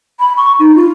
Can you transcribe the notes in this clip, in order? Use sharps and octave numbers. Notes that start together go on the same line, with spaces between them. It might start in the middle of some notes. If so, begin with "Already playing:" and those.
B5
C#6
D#4
F4